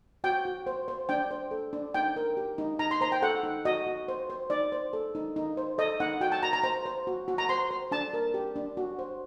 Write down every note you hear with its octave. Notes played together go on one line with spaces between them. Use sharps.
F#4 G5
F#4
C5
C5
D4 G5
C5
A4
D4
D#4 G5
A#4
G4
D#4
D#4 A#5
C6
C5 A#5
G5
A4 F#5
D#4
F#4 D#5
F#4
C5
C5
D#4 D5
C5
A4
D#4
D#4
C5
A4 D#5
D#4 F#5
F#4 G5
A5
F#4 A#5
A#5
C5 A#5
C5
F#4
F#4
A#5
C5 C6
C5
D4 A5
A#4
G4
D4
F#4
C5